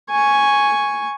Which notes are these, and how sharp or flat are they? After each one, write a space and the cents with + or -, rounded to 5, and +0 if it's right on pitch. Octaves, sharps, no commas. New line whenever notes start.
G#5 +0 C#6 +0